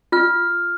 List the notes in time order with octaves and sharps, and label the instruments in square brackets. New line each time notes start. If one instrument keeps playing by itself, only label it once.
[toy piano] F4 [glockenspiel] F6